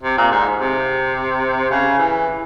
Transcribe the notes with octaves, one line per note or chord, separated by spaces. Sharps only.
C3
A#2
G#2
C3
C#3
E3